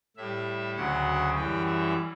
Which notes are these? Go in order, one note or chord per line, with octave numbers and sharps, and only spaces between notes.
A2 G3 E5
D2 C#3 F#3 F#5
F#2 E3 G3 G5
E5